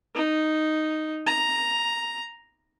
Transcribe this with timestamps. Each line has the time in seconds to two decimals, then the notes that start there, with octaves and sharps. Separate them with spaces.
0.15 D#4
1.27 A#5